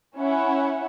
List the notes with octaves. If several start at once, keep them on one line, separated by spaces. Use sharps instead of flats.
C#4 E4 E5 F#5